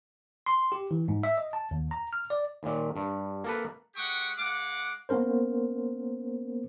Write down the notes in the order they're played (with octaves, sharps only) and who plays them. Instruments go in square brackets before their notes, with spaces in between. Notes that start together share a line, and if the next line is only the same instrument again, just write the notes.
[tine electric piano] C6
G4
E3
G#2
E5
D#5
A5
D#2
A#5
F6
D5
[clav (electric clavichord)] D#2 A#2
G2
A#3 A4 B4
[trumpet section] G#3 G4 F#5 G5 C#6 D#6
G#3 F5 F#5 D6
[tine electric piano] A#3 B3 C#4 A#4 C5